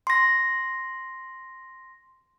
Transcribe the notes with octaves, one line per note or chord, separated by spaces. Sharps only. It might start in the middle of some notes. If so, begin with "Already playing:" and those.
C6 A#6